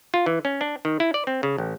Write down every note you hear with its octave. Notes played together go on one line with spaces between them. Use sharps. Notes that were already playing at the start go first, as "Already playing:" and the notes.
F4
E3
C#4
D4
D#3
E4
D5
C4
C#3
A1